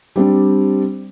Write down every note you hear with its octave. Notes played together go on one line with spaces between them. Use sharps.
G3 C4 D4